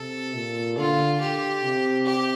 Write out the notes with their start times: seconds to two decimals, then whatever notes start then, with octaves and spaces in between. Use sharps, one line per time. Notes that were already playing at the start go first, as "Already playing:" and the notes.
Already playing: C3 A4
0.35 A#2
0.78 D3 F4
1.20 G4
1.63 C3
2.06 G4